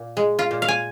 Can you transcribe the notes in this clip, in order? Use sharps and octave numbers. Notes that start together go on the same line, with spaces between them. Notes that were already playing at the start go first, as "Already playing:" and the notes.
Already playing: A#2
G#3
F4
A#2
F5
G#5